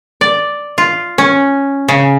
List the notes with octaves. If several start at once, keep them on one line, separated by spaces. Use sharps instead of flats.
D5
F4
C#4
C#3